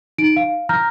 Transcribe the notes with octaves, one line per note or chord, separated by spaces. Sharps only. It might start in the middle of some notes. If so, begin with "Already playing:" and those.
D#4 D7
F5
A#5 F6 G6 A#6